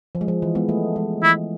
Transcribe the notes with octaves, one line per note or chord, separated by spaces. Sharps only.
F3
G#3
F3
E3
G#3 B3
A3
G#3
E3 E4